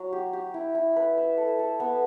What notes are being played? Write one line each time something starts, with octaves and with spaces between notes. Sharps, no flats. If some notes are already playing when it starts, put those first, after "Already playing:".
Already playing: F#3
G4
G4
E4
E4
B4
E5
A4
A4
B3